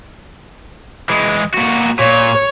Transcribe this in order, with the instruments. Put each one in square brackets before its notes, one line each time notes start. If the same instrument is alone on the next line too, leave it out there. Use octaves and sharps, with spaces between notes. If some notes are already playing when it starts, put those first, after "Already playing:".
[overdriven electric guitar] E3 G#3
A#2 F#4
[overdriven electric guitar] A#2 [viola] C#5